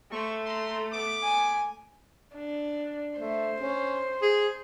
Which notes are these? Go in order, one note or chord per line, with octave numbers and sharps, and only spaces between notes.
A3 C5 C6 C#6
A#5 C6
B3 D6
G#5
D4
A3 C5
C#4
G#4